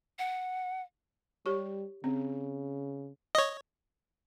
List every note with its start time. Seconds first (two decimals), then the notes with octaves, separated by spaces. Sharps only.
0.19 F#5
1.46 G3 G4 C#5 C#6
2.04 C#3 C4
3.35 C#5 D#5